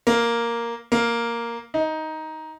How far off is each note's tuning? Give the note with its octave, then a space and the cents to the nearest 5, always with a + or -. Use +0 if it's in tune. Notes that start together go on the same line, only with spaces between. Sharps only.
A#3 +0
A#3 +0
D#4 +10